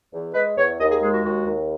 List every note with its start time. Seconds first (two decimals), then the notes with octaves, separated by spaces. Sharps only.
0.13 E2
0.34 G#3 B4
0.57 E2 C#5
0.80 D#2 D#5
0.90 G#4
1.02 G#3 G#4
1.13 F#4
1.24 D#2 F#4
1.46 D#2